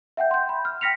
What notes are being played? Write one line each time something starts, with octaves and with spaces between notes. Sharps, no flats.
E5 F#5 G5 G6
C6 G6
B5
F6
G5 F6 A#6 B6 C#7 F7